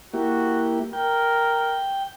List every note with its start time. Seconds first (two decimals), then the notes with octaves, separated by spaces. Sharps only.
0.14 A#3 E4 F#4 G4
0.93 A#4 G5